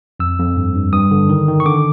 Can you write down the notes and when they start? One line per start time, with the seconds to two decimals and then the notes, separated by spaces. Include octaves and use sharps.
0.20 F2 E6
0.38 F2
0.57 G2
0.75 G2
0.93 G2 D#6
1.11 D3
1.29 D#3
1.48 D#3
1.60 C#6
1.66 D3 D6